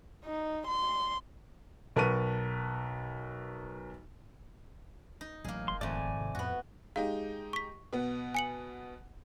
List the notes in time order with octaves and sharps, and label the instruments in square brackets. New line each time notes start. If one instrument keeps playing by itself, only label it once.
[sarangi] D#4
C6
[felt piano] B1 A#4 B4 A5 C#6 D#7
[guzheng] D#4
[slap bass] A1 F#3 [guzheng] A#3 G#4
[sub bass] F1 [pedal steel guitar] C6
[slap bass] G#1 [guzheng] F2 A3 [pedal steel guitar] D5 G#5
[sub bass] C3
[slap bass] F2 [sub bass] A2 [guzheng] B3 F#4
[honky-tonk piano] G#3 D#4 G4 [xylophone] F5
[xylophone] C#6 B6
[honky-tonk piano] B2 B3
[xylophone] G#5 C#7 F#7